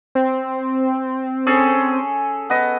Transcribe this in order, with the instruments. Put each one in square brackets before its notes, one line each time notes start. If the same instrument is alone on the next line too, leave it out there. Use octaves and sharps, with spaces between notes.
[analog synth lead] C4
[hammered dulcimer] C#4 G#4 A4
B3 D#5